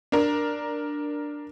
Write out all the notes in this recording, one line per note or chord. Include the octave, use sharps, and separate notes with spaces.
D4 A#4